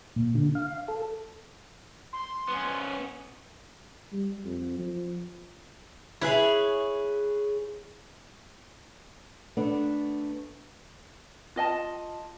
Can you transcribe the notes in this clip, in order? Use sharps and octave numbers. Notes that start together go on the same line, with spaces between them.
A#2
D3
F5
A4
C6
B3 C#4
G3
F2
F3
E4 G#4 B4 C#5
A3 B3 D4
F4 D#5 F#5 A5